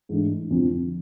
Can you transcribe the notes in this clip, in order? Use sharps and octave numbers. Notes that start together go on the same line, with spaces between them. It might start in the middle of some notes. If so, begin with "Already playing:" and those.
G#2 E3 A3 D4
F2 D3 F3